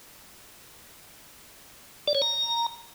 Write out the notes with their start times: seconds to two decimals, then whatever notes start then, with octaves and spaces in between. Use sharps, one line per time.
2.08 D5
2.15 C#5
2.22 A#5